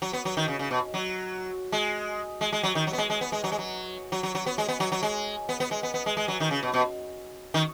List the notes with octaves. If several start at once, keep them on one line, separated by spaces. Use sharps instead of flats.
F#3
B3
F#3
D#3
C#3
C#3
B2
F#3
G#3
G#3
G#3
F#3
D#3
F#3
B3
G#3
G#3
B3
G#3
F#3
G#3
F#3
F#3
F#3
F#3
B3
G#3
B3
F#3
F#3
G#3
B3
B3
G#3
B3
B3
G#3
G#3
F#3
D#3
C#3
B2
B2
D#3